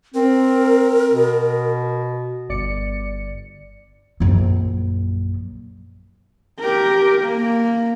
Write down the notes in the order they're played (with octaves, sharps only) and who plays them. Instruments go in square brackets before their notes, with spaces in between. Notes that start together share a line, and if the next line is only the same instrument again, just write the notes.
[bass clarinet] C4 [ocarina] A#4
[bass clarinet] B2
[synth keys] G1 D5 C#7
[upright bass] A#1 F#2
[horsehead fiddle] G4 A#4
A#3